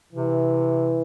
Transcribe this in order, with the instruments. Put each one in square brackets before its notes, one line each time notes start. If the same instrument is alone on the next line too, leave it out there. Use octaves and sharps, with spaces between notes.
[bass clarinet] C3 [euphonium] E3